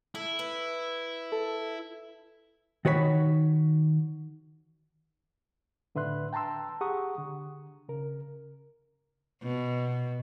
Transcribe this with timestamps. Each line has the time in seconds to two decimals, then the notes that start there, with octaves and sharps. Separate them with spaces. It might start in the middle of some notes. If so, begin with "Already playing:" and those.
0.15 E4 A4
0.39 B4
1.32 A4
2.85 D#3 F#4 C#5 D5 B5
5.95 A2 D3 B4 E5 C6 F#6
6.33 G5 A5 A#5 C6 E6
6.81 G4 G#4 F#5 A#5 C#6 D#6
7.18 D3
7.89 C#3 A#4
9.43 B2